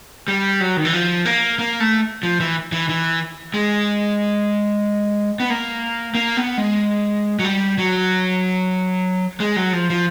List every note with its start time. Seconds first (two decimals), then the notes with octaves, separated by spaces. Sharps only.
0.28 G3
0.60 F#3
0.77 D#3
0.85 E3
0.93 F3
1.26 A#3
1.59 A#3
1.80 A3
2.23 F3
2.40 E3
2.72 E3
2.89 E3
3.54 G#3
5.40 B3
5.50 A#3
6.15 A#3
6.37 B3
6.57 G#3
7.39 F#3
7.45 G3
7.78 F#3
9.40 G#3
9.56 F#3
9.73 F3
9.90 F3